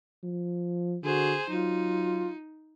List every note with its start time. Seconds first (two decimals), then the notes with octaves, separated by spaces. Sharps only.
0.24 F3
1.04 D3 F#4 G#4 C5
1.50 F#3 D#4 F4